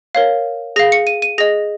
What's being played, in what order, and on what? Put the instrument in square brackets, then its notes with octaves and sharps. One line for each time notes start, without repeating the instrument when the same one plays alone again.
[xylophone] A#4 C#5 F5
G#4 F5 A#6
C#7
D#7
D#7
G#4 D#5 A#6